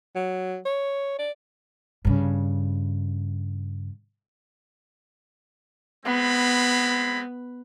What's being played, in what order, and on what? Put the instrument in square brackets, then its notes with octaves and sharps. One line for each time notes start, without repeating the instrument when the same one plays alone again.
[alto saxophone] F#3
C#5
D5
[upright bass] G2 C#3
[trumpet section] G#3 C4 B5 [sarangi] B3